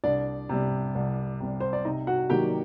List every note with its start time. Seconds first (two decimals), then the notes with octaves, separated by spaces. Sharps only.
0.04 C2 D4 D5
0.49 C3 G3
0.95 C2
1.40 C3 G3
1.60 C5
1.73 D5
1.85 C3 D#4 D#5
2.07 F#4 F#5
2.30 D#3 F#3 A#3 G4 G5